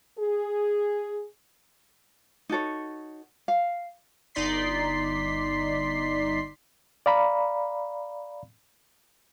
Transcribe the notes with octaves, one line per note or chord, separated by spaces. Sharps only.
G#4
D#4 F#4 A4 C#5
F5
G1 D#4 D5 C6 B6 C7
D5 F5 A#5 B5